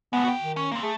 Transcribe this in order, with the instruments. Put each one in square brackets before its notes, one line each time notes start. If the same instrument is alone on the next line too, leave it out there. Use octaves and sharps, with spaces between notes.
[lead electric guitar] A2 G#3 [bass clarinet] B3
[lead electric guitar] F#4 G5
[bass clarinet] D#3
[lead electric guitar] C#4
A#3 C4
[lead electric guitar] A3 [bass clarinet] G#4